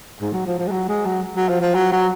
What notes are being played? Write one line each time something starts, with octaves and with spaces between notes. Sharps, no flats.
G#2
F#3
F3
F3
G#3
F#3
G#3
F#3
F#3
F3
F3
F#3
F#3